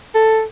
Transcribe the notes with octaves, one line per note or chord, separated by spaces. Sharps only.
A4